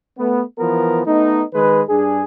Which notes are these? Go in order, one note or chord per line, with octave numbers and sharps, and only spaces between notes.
A3 B3
E3 F3 B3 A#4
A3 B3 D#4
D#3 G#3 B4
G2 D4 G#4